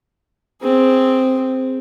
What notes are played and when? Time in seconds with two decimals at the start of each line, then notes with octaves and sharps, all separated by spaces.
0.61 C4 G#4